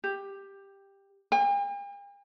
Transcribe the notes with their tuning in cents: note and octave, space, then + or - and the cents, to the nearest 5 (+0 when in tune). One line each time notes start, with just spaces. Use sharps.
G4 +10
G5 +45